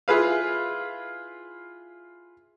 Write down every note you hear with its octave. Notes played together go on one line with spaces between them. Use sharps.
E4 F4 G#4 B4 F5